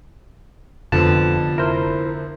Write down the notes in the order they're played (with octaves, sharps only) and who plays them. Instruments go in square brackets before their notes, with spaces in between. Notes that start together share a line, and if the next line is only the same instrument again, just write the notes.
[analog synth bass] F1 [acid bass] F2 [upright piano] D3 F3 B3 [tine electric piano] A5
[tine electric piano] E4 C5 [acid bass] A#4